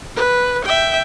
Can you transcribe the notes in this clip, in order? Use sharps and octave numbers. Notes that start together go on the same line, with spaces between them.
B4
E5 G5